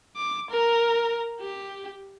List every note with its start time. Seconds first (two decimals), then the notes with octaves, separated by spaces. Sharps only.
0.17 D6
0.51 A#4
1.41 G4